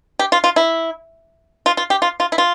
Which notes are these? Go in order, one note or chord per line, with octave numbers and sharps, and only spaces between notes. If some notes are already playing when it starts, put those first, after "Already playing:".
G4
F4
F4
E4
F4
F4
G4
F4
F4
E4
F4